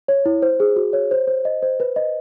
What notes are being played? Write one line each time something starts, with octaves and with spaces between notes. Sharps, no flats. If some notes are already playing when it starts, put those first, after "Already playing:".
C#5
E4
C5
G#4
F#4
C#5
C5
C5
D#5
C5
B4
D#5